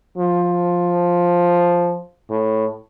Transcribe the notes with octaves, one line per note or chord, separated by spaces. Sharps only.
F3
A2